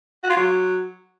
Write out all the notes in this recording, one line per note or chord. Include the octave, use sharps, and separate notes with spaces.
F#4
F4
F#3